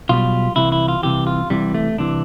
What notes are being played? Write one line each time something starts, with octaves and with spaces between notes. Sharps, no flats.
B1 B2 G3 F4
C2 C3 E3 E4
E4
F4
C2 C3 E3 G4
F4
C2 C3 E3 G3
A3
C2 C3 E3 D4